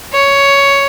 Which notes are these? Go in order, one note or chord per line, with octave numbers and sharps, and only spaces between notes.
C#5